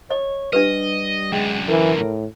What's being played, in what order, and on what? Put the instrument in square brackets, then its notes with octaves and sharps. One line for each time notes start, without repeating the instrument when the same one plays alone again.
[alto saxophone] C#5 [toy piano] D#5
[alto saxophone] G3 [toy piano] D4 G4 B4 [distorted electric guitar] D#5
[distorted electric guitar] F#2 D3 [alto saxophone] G#3 [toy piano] G5
[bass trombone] E3 [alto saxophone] A#4
[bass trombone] A2